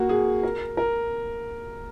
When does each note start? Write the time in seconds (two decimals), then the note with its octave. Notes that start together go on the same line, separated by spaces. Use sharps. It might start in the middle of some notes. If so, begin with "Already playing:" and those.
Already playing: A#3 F#4
0.09 G#4
0.43 A#4
0.77 A#4